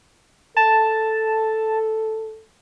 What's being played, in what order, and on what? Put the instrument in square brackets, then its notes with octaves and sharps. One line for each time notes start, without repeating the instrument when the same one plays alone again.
[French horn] A4 [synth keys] A5